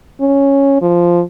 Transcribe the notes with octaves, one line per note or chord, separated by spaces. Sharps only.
C#4
F3